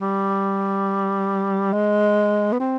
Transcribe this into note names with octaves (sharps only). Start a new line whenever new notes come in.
G3
G#3
B3
C4